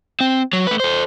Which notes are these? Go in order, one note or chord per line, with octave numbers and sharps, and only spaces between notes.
C4
F#3
A3 B4
A4 C5